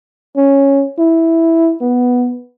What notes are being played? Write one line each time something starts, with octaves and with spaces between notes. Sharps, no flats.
C#4
E4
B3